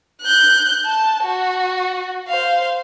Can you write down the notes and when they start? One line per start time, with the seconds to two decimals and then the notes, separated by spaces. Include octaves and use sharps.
0.22 F#6 G6
0.86 A5
1.24 F#4
2.28 C5 F5